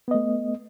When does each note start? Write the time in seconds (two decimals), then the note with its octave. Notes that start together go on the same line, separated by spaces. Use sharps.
0.08 B3
0.11 D#5
0.14 A3